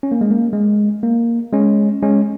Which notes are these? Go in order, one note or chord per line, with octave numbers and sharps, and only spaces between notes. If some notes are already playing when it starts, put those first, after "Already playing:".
C#4
A#3
G#3
A#3
G#3
A#3
G#3 C#4
G#3 C#4